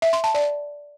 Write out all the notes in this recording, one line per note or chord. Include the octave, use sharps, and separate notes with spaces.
E5
C6
A5
D5